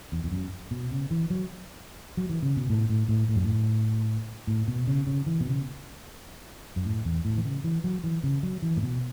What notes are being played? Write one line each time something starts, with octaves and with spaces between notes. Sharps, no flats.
E2
E2
F#2
B2
C#3
E3
F#3
F#3
E3
C#3
B2
A2
A2
A2
A2
F#2
A2
A2
B2
C#3
C#3
E3
B2
C#3
F#2
A2
E2
A2
E3
C#3
E3
F#3
E3
C#3
F#3
E3
A2
B2